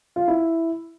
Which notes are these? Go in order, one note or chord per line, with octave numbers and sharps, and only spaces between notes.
F4
E4